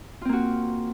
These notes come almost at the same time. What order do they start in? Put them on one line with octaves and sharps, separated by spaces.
F4 C4 A#3 F#4